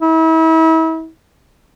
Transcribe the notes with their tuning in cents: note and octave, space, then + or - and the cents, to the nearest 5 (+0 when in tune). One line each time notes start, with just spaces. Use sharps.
E4 -35